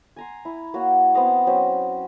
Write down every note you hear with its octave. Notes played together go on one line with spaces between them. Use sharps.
G#5 A#5 C6
E4
A#3 F#4 C#5 F#5
B3 C4 D#5 F5
F#3 C4 C#4